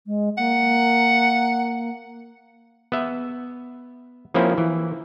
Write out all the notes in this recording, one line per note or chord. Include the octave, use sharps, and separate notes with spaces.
G#3
A#3 F#5
B3 E5
F3 A#3 C4 C#4 E4
E3